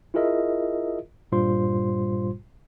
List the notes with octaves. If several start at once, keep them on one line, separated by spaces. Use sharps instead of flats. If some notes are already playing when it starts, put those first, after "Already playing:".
E4 F4 G#4 A#4 D#5 E5
G2 A#2 G3 F4 C5 C6